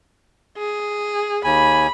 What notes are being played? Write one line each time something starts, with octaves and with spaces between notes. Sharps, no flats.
G#4
D#2 G#5 B5